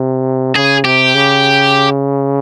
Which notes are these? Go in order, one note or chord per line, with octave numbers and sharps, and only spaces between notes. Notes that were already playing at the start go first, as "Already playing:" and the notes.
Already playing: C3
C#3 G#4
C3 G4
C#3